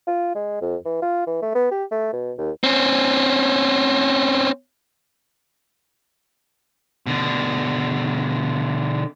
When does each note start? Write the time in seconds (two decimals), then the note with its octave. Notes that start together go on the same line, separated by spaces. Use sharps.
0.08 F4
0.35 G#3
0.61 F2
0.85 E3
1.02 F4
1.27 E3
1.42 A3
1.55 B3
1.71 G4
1.91 A3
2.13 B2
2.38 D#2
2.64 C4 C#4
7.07 B2 D3